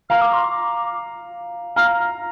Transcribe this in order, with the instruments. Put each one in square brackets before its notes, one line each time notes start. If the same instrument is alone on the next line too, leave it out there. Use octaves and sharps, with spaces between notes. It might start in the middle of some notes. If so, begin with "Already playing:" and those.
[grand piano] F5 A#5 [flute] F6
[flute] D6
C6
D6
[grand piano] F5 A#5 [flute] F6